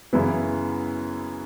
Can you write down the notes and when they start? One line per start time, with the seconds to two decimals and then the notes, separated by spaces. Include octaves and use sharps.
0.13 F#2 C#3 E3 B3 E4